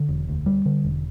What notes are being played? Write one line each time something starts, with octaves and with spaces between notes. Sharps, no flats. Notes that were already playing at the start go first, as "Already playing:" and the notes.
Already playing: D3
E1
D2
G3
D3
E1